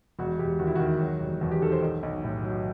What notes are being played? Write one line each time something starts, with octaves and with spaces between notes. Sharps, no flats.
E1 F#4
E1 G4
D#2 F#4
E4
D#3 F#4
F#3
E1
E2 F#4
G4
D#3 A4
C5
B1
B1
A2
F#3